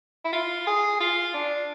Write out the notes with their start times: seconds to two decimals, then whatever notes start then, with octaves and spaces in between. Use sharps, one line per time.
0.25 E4
0.33 F4
0.67 G#4
1.01 F4
1.34 D4